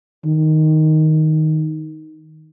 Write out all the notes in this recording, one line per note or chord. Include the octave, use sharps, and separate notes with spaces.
D#3